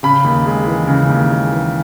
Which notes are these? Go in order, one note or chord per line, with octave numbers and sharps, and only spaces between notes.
C#3 B5
D#2
G#3
E3
C#3
D#2
G#3
E3